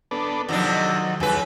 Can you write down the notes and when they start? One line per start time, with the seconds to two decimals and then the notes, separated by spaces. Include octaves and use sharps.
0.11 B3 D4 A4
0.49 F2 C3 D#3 F#3 D4
1.20 E2 C#3 G3 B4